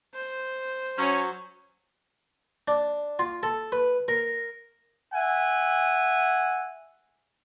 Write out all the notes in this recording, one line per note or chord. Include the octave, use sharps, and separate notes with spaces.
C5
F#3 C#4
D4
F4
A4
B4
A#4
E5 F#5 G#5